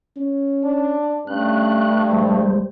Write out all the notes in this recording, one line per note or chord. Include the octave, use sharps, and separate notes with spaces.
C#4
D4
G2 A3 C#4 F#6
A#1 G3 G#3 C5